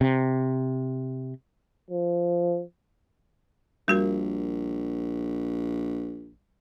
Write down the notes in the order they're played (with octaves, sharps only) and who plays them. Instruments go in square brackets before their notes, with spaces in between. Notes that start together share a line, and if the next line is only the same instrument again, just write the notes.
[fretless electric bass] C3
[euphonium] F3
[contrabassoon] A#1 [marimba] G3 F#4 A#4